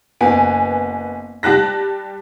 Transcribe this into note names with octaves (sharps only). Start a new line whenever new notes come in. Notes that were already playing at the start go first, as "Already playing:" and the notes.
F#1 B3 G#5
G3 G4 A5 F#6 A#6